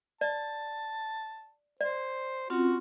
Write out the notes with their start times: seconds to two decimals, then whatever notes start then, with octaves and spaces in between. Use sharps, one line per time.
0.21 D5 A5
1.81 C5 D5
2.50 C4 C#4 F4 F#4